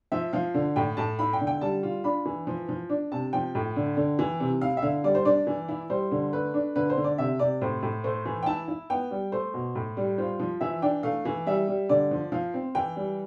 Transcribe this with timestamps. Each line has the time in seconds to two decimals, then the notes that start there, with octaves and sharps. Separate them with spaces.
0.12 F3 E5
0.33 F3 F5
0.54 D3
0.76 A2 G5
0.97 A2 A5
1.19 E4 B5
1.33 G5
1.41 D3
1.47 G5
1.61 G3 A5
1.83 F4
2.04 D4 B5
2.25 E3
2.47 F3
2.69 F3
2.90 D4
3.12 C3 A5
3.33 F3 G5
3.55 A2
3.76 D3
3.97 D3
4.19 E3
4.40 C3
4.61 E4 F5
4.77 E5
4.83 D3 F5
5.04 G3 D5
5.15 C5
5.25 D4 D5
5.47 E3
5.69 E4
5.90 G3 C5
6.11 D3
6.33 A3 B4
6.54 D4
6.76 D3 B4
6.90 C5
6.97 D3
7.04 D5
7.18 C3 E5
7.39 C3 D5
7.61 A2 C5
7.83 A2
8.04 A3 C5
8.25 E3
8.43 G5
8.46 E4 A5
8.68 E4
8.90 B3 G5
9.11 G3
9.32 A3 C5
9.54 B2
9.75 A2
9.97 G3
10.18 F4 C5
10.39 F3
10.61 E3 E5
10.82 D4 G5
11.03 A3 F5
11.25 E3
11.47 G3 E5
11.68 G3
11.89 D3 D5
12.11 F3
12.32 F3 F5
12.54 C4
12.75 E3 G5
12.96 G3